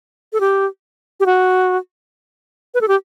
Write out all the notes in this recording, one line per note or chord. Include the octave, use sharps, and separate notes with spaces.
A4
G4
G4
F#4
B4
A4
G4